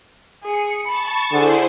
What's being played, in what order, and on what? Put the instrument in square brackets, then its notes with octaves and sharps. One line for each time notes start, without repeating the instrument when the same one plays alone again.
[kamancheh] G#4 [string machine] C#7
[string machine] A5 C#6 [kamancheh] B5
[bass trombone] D3 [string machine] E4 C5 [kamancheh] G#4